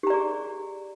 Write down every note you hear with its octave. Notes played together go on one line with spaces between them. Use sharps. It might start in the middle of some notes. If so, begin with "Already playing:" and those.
G4 G#4 D5 A#5